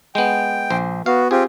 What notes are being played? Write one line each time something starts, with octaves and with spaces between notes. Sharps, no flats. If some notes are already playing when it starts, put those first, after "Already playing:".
G#3 B3 G5
A#1 C5
B3 F#4 F5
C4 F4 G4 G#4